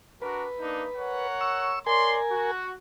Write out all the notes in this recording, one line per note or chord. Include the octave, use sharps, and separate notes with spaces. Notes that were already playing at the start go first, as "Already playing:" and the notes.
D4 F#4 A#4 B4
A#3 D4 D#4
A#4 C#5 F#5
C#6 E6
A#4 C#5 D5 G#5 C6
F#4